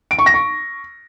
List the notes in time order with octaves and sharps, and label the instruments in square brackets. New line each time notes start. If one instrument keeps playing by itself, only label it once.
[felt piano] D7
C#6
A#6
C#6